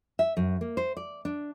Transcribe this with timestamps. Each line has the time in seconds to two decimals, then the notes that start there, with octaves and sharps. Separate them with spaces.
0.19 E5
0.37 F#2
0.61 A#3
0.77 C5
0.97 D5
1.25 D4